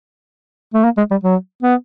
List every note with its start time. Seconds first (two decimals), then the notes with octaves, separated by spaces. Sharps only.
0.74 A3
0.84 A#3
0.97 G#3
1.11 G3
1.24 F#3
1.63 B3